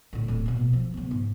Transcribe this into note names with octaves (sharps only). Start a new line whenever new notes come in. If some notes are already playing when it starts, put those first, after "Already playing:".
A2 D3
D1 A2
B2 A#3
F3
C#3 B3
G#2